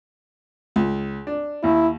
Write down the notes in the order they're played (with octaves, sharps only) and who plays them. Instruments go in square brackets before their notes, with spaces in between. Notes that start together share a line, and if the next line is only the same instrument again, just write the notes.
[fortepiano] C#2
D4
[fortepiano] D#2 [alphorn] E4